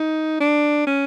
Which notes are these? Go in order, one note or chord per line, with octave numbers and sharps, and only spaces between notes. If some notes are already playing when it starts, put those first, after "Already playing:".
Already playing: D#4
D4
C#4